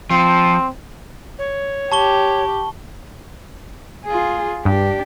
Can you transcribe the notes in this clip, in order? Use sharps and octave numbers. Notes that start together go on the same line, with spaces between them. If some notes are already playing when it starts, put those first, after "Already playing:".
F3 C4
C#5
G4 A5 C#6 G7
F4 G#4
G2 D4 G4